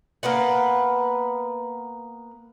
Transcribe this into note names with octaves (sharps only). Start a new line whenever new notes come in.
A#3 B3 B4 F#5